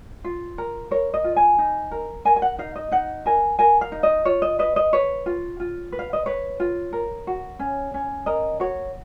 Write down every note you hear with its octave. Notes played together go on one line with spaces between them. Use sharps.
F4
A#4
A#4 C#5
D#5
F4
G#5
D#4
A#4
A#4 G#5
G#5
F#5
D#4 F5
D#5
D#4 F#5
A#4 G#5
A#4 G#5
F5
D#4
D#5
F4 C#5
D#5
B4 D#5
D#5
B4 C#5
F4
F4
B4
F5
D#5
B4 C#5
F4
A#4
F#4
C#4
C#4
A#4 D#5
F#4 C#5